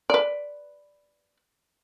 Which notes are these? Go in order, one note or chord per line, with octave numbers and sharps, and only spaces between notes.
B4 D5